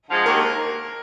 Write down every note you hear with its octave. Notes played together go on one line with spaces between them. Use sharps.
D3 F3 G#3
D#2 A#4